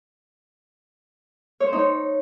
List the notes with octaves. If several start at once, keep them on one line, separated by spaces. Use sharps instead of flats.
C#5
C5
D#4
C#5